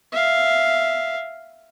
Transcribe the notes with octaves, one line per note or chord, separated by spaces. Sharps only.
E5 F5